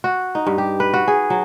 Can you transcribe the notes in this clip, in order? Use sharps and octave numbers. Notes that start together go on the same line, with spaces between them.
F#4
D#4
G2
G4
B4
F#4
G#4
F#3